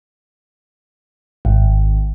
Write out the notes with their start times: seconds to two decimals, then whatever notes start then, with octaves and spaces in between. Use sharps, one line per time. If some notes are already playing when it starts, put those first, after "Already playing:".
1.45 G#1